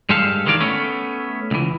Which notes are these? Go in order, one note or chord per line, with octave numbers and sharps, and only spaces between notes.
G2 G#3 G4 A4 F5
D2 D#3 E3 G#3 D5 F5
A3 B3 C#4
C#2 E3